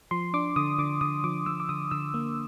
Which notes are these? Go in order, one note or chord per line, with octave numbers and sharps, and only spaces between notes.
F3 C6
D4 D6
D3 D#6
D3 D6
D3 D#6
F3 D6
F3 E6
D6
D3 D#6
D3 E6
A#3